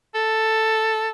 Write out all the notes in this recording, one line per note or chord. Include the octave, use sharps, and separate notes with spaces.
A4